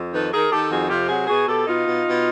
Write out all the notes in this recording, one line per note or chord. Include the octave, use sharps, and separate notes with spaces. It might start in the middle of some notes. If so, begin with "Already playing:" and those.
Already playing: F2
D#3 A4 B4
D#3 G#4 A#4
D#3 G4 A4
F2 F#4 G#4
C3 F4 G4
F#3 F#4 G#4
B2 F#4 G#4
B2 G4 A4
B2 D#4 F4
B2
B2